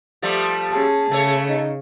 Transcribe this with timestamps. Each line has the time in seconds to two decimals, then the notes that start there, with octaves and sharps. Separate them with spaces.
0.22 F3 G3 A3
0.72 C#4 G#4 A5
1.11 C#3 A3 C#5
1.48 D#4